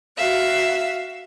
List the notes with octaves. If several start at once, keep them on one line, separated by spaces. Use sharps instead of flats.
F#4 E5 F5